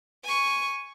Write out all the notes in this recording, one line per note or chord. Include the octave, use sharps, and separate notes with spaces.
G#5 C#6